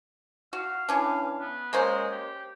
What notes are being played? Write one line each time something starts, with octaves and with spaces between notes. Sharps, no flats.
F#4 F5
E3 C#4 D4
B3
G#3 A#3 C#4 C5
G4